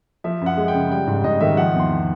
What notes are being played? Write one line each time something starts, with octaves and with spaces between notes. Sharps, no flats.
F3 E5
F#2 F#5
G#3
G5
C#3
G3 G5
G#2
G#2 D#5
D#3 E5
F3 F#5
E2 C6